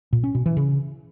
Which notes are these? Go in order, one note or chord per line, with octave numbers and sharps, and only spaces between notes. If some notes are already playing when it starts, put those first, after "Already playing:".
A#2
C#4
B2
E3
C#3